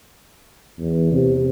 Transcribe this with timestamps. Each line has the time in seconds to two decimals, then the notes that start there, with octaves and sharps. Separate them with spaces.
0.79 E2
1.12 C3